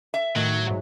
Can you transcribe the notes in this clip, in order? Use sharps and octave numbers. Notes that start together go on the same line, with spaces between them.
E5
A2 D#3 F#3
G#2 F#3